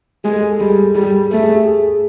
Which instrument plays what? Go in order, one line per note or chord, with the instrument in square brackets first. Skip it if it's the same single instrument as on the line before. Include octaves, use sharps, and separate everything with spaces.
[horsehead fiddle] G#3 [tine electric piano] G4
[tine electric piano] A4
G#4
A4
[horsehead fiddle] G3 [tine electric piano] G#4
[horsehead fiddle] G3
[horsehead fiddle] A3 [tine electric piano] A4
[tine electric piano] G#4
G4
G#4